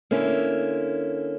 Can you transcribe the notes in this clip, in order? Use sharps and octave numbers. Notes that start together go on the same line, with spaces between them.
D3 A#3 C#4 E4